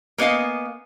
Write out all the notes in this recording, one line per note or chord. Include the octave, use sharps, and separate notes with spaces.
A#3 B3 D#5 F5 G#5